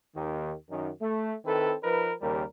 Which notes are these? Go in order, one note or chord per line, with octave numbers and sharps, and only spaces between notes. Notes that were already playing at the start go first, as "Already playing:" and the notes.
D#2 D#3
F#2 D#3
A3
D#3 C4 E4 A4 B4
F3 D#4 A#4 B4
D#2 C#3 G3 A#4